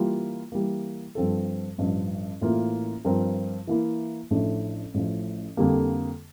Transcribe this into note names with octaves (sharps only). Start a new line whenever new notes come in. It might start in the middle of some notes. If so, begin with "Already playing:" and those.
Already playing: E3 G3 A#3 F4
E3 G3 A#3
G2 F3 C4 F4 A4
A1 G2 F3
A1 A2 E3 A#3 F4
G2 F3 C4 F4 A#4
E3 A#3 E4 A#4
A1 A2 F3 A3 D4
A1 A2 F3
F2 D3 G3 A#3